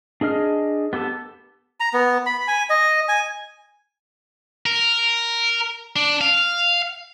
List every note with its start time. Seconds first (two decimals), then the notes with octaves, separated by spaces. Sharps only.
0.21 D4 G#4 D#5 F6
0.93 B3 G4 A4 A5
1.80 A#5
1.94 B3
2.26 B5
2.48 G#5
2.70 D#5
3.09 G#5
4.66 A#4
5.96 D4
6.21 F5